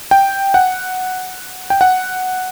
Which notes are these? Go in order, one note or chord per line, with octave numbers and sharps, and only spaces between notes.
G5
F#5
G5
F#5